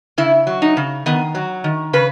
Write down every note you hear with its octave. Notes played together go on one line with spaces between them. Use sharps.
C#3 E4
F#3
D#4
C#3
D#3 B3
F#3
D#3
C#3 B4